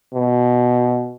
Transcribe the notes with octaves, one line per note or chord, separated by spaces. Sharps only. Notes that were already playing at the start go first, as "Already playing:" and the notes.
B2